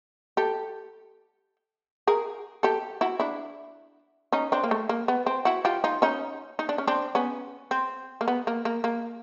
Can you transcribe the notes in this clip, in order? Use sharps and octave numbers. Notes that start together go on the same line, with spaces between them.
G4 A4
G#4 A#4
G4 A4
E4 F#4
D4 E4
C#4 D#4
C4 D4
A#3
A3
A#3
B3
C4
E4 F#4
F4 G4
D#4 F4
C#4 D#4
D#4
D4
C#4
C4 D4
B3 C#4
C4
A#3
B3
A#3
A#3
A#3